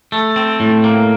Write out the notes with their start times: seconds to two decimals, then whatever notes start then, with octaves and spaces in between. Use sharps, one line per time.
0.12 A3
0.36 C4
0.60 A2
0.84 A#3